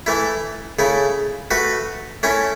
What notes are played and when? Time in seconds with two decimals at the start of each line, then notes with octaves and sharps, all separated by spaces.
0.06 E3 A3 E4
0.79 C#3 A3 E4
1.51 A3 F#4 B4
2.23 A3 C#4 E4